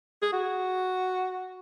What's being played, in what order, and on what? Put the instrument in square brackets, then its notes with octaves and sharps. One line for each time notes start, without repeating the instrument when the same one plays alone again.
[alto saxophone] G#4
F#4